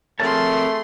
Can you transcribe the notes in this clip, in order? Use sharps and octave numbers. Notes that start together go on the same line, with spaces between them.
A3 C4 G#4 A#4 C#5 A5 C6